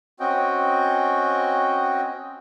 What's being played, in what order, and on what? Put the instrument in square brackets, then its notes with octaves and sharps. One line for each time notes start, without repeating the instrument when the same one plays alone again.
[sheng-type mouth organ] C4 C#4 F#4 D#5 G5